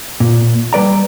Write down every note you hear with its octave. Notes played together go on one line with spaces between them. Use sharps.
A#2
G3 B4 D5 A#5